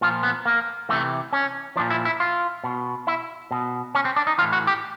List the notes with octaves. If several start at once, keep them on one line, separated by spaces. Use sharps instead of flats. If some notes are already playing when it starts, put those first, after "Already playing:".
A#2 F3 F4
B3
A#3
C3 E3 A3
C#4
A#2 F3 D4
E4
E4
F4
B2
E4
B2
C#4
C4
D4
D#4
A2 E3 F4
F#4
G4